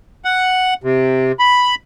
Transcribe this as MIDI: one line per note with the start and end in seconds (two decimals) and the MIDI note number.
0.25 0.74 78
0.84 1.32 48
1.39 1.75 83